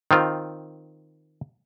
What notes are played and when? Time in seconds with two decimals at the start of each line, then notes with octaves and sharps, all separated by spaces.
0.11 D#3 C4 F4